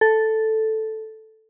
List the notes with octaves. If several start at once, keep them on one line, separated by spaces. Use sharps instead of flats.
A4